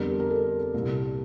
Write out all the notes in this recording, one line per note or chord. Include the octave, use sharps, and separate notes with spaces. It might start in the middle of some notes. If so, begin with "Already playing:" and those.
Already playing: F2 D3 G3 B3 A#4
A#4
A4
C2 A#2 G3 A#3